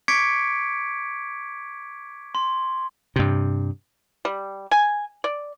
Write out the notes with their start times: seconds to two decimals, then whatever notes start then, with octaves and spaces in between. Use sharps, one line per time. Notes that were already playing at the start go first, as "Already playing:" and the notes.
0.08 C#6 D6 G#6 B6 C#7 D7
2.35 C6
3.16 G2 C3
4.25 G3
4.71 G#5
5.24 D5